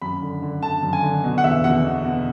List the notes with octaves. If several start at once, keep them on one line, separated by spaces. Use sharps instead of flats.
F#2 B5
D3
D3
D3 A5
F#2
G#5
D3
B2
F#5
E2 E5
E2 F#5
B2
B2